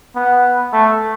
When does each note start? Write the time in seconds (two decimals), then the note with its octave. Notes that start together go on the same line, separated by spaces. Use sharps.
0.16 B3
0.73 A3